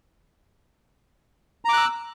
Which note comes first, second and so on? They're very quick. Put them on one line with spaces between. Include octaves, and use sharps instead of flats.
A#5 D6 F#6 E6